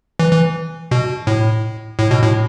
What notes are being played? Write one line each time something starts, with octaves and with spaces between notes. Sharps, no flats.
E3
E3
B2
A2
A2
B2
A2